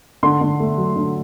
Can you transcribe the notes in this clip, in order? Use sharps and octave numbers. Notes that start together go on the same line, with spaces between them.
D3 C6
D3
A3
F#3
D3